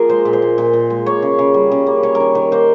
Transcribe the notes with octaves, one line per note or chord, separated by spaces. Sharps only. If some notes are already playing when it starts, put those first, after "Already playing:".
Already playing: F3 A#3 F4 G#4 A#4
G#3 C5
A#2
C5
A#2
A#2
A#2
G#3
A#3 C#5
C#3
C#3
G3
C#3
A#3
A#3 C#5
A#4
D#3
D#3
A#3 C5